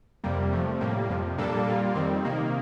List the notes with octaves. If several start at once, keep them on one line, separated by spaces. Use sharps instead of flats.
F2 C3 G3 A#3
C3 F3 A3
A2 G3 A#3
F2 C3 F3
A#2 G3 A#3 D4 A4
A#2 G3 A#3 F4
F2 D#3 G3 C4
C3 D#3 A#3